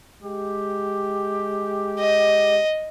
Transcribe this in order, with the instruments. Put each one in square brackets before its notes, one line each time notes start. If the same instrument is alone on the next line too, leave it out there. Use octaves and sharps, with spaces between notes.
[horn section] G#3 G4
[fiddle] D#5